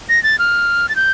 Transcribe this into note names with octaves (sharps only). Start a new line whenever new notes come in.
A#6
A6
F6
A6
G6